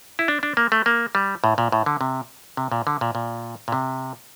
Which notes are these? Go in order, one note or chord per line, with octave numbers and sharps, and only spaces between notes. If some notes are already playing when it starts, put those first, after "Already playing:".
E4
D4
D4
A#3
A3
A#3
G3
A2
A#2
A2
D3
C3
C3
A#2
D3
A#2
A#2
A#2
C3